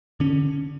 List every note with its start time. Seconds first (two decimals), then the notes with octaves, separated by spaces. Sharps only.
0.20 D3 C#4